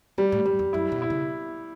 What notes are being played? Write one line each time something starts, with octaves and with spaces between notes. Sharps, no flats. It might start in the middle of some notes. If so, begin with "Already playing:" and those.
E3 G3
A2
F#2 G3
E2
F#2 E4
B2
E4
C#3